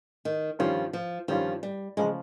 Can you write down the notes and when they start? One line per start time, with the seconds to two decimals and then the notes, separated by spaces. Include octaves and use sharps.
0.25 D#3
0.59 G2 D#3 F3 G3 C#4 F4
0.93 F3
1.28 G2 D#3 F3 G3 C#4 F4
1.63 G3
1.97 C#3 F3 G#3